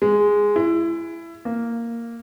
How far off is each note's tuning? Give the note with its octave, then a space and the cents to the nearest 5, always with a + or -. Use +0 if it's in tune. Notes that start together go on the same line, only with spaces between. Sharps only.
G#3 -5
E4 +20
A#3 -5